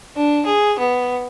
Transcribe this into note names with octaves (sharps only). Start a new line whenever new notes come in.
D4
G#4
B3